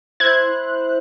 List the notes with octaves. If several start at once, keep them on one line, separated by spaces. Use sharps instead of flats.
E4 C5 F#6 G#6